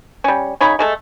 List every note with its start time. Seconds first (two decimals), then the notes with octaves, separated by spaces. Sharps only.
0.24 G3 C#4
0.61 C#3 D#4 C#5 B5
0.79 G#3 A3 A4